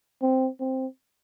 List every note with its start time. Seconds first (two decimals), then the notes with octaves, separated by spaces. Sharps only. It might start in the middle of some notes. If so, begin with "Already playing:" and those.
0.22 C4
0.60 C4